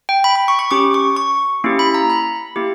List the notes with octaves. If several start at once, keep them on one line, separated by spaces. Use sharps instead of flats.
G5
B5
B5
C#6
C#6
C#4 G4 D6
C#6
C#6
A#3 C#4 E4 G4
B5
A#5
B5
A#3 E4 G4